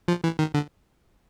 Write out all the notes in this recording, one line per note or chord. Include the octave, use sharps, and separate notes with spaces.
F3
E3
D#3
D3